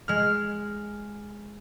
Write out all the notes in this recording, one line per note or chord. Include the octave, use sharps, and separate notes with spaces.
G#3 F6